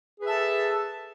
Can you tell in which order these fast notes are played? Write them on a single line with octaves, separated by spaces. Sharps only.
G#4 B4 E5 A5 A4